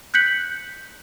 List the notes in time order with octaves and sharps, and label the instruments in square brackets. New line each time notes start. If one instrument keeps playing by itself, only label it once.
[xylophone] F#6 G6 B6 C#7 F#7